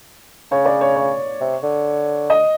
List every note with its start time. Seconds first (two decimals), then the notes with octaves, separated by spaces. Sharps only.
0.51 C#3 C#5
0.65 D5
0.81 C#5
0.96 C#5
1.41 C3
1.63 D3
2.30 D#5